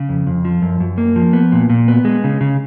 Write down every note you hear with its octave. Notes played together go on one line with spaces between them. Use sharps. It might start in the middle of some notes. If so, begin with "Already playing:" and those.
Already playing: C#3
F2
F2
F3
F#2
F#2
A#3
F3
B3
A#2
A#2
B3
G#3
C#3
C#3